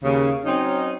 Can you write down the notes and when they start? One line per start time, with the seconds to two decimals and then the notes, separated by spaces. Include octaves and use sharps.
0.03 D#2 C#3
0.45 F#3 C4 C#4 D#4